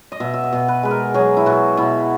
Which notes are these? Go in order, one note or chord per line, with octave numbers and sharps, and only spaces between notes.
D#5
B2 E5
E5
D#5
B2
B4
G#3 B4
A#4
F#3 G#4
E4
B2 F#4
B2 E4